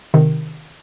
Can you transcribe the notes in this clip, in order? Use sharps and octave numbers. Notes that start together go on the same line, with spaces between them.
C3 D#3